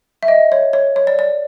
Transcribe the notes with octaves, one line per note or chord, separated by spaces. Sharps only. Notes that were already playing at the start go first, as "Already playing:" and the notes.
E5
D#5
C#5
C#5
C#5
D5
D5